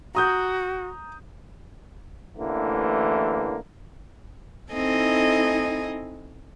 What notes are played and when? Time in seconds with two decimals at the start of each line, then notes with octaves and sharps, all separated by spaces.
0.15 F#4 A#5 D#6 G6
2.38 A1 D3 E3 A3 A#3
4.73 C4 D#4 E4 A4 D#5 G#5